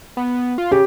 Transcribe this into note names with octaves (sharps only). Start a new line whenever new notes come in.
B3
F4
C#3 G4